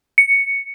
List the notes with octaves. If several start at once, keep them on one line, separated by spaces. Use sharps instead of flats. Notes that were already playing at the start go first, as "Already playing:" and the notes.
C#7